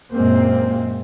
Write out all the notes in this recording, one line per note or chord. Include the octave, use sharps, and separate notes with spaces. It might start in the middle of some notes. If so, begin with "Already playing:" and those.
F#2 A#2 G#3 A#3 C4